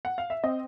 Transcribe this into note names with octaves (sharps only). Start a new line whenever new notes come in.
F#5
F5
E5
C4 D#5